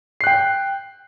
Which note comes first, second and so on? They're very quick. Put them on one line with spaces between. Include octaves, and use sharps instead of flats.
C7 F#6 G5